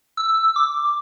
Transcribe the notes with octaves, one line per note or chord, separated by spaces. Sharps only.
E6
D6